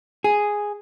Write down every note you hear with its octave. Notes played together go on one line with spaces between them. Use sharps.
G#4